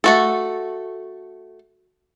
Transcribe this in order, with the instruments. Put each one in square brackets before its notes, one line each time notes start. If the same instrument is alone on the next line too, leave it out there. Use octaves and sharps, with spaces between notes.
[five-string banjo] A3 F#4 A4